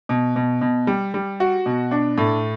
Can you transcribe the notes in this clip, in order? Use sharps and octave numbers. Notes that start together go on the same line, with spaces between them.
B2
B2
B2
G3
G3
F#4
B2
D4
A2